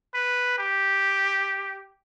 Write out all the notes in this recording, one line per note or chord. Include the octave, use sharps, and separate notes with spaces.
B4
G4